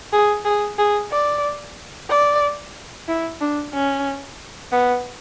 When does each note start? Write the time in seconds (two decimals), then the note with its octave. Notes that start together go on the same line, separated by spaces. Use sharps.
0.13 G#4
0.45 G#4
0.78 G#4
1.11 D5
2.09 D5
3.08 E4
3.41 D4
3.74 C#4
4.72 B3